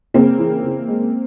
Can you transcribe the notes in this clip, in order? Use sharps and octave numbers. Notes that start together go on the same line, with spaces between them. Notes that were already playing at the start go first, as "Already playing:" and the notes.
C#3 A#3 C4
E3
C#3
G#3